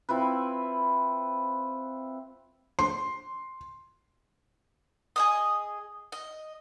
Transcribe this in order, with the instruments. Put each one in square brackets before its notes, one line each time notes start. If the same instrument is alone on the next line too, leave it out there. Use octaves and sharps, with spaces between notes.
[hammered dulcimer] C4 E4 F4 B4
[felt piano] C6
[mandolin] G#4 D#5 D#6
D#5